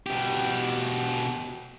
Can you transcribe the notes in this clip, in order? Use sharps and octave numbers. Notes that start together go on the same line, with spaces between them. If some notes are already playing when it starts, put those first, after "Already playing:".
B2 G4